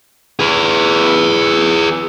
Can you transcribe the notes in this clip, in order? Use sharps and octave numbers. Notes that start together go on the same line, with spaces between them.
G#4 B4